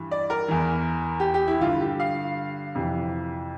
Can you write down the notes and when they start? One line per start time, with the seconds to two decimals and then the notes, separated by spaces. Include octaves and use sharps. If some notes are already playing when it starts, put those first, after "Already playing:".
Already playing: G2 E3
0.11 D5
0.30 A#4
0.48 E2 E3
1.20 G4
1.34 G4
1.47 E4
1.61 G2 D3 F4
1.81 G4
2.00 F5
2.75 F2 C3 E3